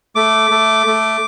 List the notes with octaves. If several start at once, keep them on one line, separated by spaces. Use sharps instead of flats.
A3 D6
A3
A3